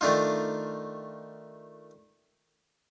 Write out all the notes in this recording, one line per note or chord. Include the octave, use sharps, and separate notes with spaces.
D#3 A3 D4 D#4 F4